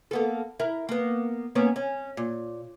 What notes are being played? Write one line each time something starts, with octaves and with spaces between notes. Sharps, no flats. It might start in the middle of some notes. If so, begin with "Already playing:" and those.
A#3 B3 A4
E4 A#4
A#3 B3
A#3 B3 C#4
C#4
A#2